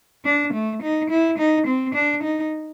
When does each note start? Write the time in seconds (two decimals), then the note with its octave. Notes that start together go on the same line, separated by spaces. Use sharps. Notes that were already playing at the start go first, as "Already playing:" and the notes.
0.25 D4
0.53 A3
0.82 D#4
1.10 E4
1.38 D#4
1.67 C4
1.94 D4
2.23 D#4